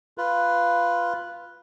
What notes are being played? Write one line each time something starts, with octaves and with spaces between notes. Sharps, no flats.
F4 B4